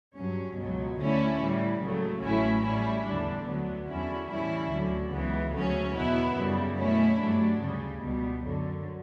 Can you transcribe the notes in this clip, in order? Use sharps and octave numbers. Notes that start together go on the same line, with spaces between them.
G2 F#3 C#4
C#2 B2 F#3
D2 D3 A3 C#4 E4
A2 E3 G3
C#2 C#3 F#3 A3
A1 A2 F#3 C#4 E4
A2 G3 C#4 E4
E2 D3 G3 D4
D2 D3 F#3 B3
E2 D3 F#3 C#4 E4
A2 E3 G3 C#4 E4
D2 D3 F#3
C#2 C#3 E3 B3
D2 C#3 F#3 A3 C#4
E2 B2 F#3 B3 E4
F#2 C#3 G3
B2 A3 C#4 E4
G2 F#3 A3 D4
D2 C#3 G3
C#2 B2 G3
F#2 D3 F#3